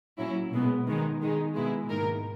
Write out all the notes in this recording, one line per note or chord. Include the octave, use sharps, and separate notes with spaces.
A#2 F#3 C#4 E4
B2 G#3 B3
D#3 G#3 B3 D#4
D#3 G#3 D#4
B2 G#3 B3 E4
G#2 D#3 A#3 D#4 A#4